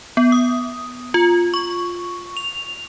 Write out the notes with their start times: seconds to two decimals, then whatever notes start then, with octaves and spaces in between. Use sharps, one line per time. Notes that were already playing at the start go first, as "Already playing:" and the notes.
0.17 B3
0.32 D#6
1.14 F4
1.54 C#6
2.37 F7